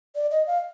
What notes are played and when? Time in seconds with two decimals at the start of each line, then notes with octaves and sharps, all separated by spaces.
0.15 D5
0.31 D#5
0.47 F5